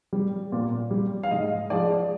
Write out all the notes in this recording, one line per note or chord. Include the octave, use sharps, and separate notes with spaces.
G3
A#2
G3
F5
G#2 D#5
F3 G#3 D5